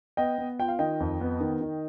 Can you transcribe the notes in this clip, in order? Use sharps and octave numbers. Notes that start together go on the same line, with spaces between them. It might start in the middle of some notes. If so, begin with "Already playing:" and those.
B3 D#5 G5
B3
F4 G5
F5
D#3 D#5 G5
F2
B3
D#3
D#3